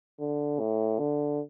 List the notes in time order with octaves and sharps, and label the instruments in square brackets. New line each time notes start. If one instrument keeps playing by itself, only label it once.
[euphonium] D3
A2
D3